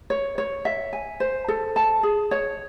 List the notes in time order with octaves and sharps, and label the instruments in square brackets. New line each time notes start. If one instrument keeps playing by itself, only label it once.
[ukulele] C#5
C#5
E5
G#5
C5
A4
A5
G#4
C#5